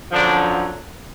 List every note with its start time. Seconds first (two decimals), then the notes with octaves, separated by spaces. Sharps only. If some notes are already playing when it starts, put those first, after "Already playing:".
0.12 F#2 D3 F3 D4